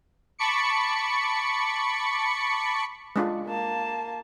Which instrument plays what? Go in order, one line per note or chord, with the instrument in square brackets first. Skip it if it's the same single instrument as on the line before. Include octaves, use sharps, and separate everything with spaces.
[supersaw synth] A5 B5 C#6 D6 C#7
[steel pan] G#3 D4 F4
[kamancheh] A#3 A5